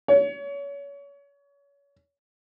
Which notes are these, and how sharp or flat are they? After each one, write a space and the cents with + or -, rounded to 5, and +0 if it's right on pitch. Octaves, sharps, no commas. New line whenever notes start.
C#5 +30